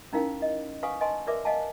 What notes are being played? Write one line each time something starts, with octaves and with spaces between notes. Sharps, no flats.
C#4 D#4 E4 A#4 F5 G5
D#5
B4 F5 F#5 G#5 C#6 D#6
B4 D#5 G#5 A5 C6
A#4 B4 D5 E5 D6
D#5 F5 F#5 G#5 A5